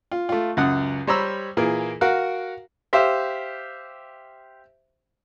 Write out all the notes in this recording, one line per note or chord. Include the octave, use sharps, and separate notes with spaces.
F4
A3 F4
C#2 F#2 F#5 D#6
G3 C5 C#5 A#5 B5 E6
A#2 E3 A#3 G#4 A#4
F#4 A#4 F5 F#5
G4 C5 E5 F5